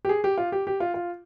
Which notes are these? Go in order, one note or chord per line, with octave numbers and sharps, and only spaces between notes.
G4
G#4
G4
F4
G4
G4
F4
F4